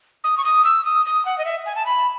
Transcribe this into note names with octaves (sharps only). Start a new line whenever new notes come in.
D#6
C#6
D#6
E6
D#6
D#6
F#5
D#5
E5
G#5
A5
B5